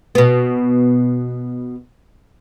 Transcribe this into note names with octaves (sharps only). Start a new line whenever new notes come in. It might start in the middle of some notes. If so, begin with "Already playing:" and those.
B2 B3